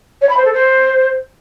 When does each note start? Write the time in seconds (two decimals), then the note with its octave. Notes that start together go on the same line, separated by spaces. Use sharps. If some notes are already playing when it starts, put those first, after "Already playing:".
0.21 C#5
0.29 B5
0.37 C5
0.45 A4
0.53 C5